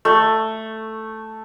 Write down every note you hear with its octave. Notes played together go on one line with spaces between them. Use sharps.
A3